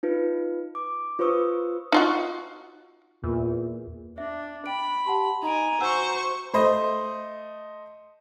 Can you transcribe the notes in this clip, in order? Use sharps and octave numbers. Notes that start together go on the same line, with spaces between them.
D#4 F4 B4
D6
F4 B4 C5 C#6 D#6 E6
D#4 F4 F#4
E2 A#2
D4 E5
G5 B5 D7
G4 F#5 A5 C6
D#4 D#5 G#5 A#5 D7
F#4 C5 F#5 G#5 C#6 E6
A3 C5 D#5